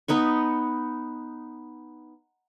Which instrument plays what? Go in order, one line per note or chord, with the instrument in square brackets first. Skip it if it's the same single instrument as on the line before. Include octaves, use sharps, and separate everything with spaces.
[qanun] B3 D#4 B4 C#6